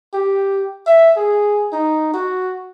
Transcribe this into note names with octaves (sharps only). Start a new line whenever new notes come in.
G4
E5
G#4
D#4
F#4